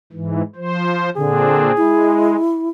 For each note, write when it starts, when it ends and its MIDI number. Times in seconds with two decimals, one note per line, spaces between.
0.12 0.42 44
0.12 0.42 52
0.56 1.10 53
0.56 1.10 72
1.16 1.72 46
1.16 1.67 50
1.16 1.72 60
1.16 1.72 62
1.16 2.40 68
1.77 2.36 56
1.77 2.69 64